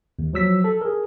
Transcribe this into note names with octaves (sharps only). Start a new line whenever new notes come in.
D#2
F3 F#3 E6 B6
A4
G#4 A#4